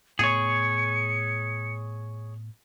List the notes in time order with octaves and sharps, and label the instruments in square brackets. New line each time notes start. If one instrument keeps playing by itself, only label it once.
[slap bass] A2 B3 [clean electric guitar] G#4 C#5 [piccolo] C#7